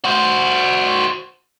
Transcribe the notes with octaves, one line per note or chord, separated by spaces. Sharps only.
F#4 C5